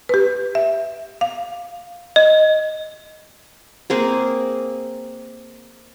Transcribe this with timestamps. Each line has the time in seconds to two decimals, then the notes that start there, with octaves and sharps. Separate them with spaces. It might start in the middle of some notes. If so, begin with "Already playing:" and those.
0.09 G4 B4
0.55 E5
1.21 F5
2.16 D#5
3.90 A#3 C4 G#4